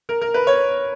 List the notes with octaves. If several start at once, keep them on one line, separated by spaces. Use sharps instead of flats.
A#4
A#4
B4
C#5